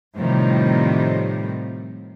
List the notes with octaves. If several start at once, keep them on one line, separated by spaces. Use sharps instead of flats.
A2 C3 D#3 F3 G3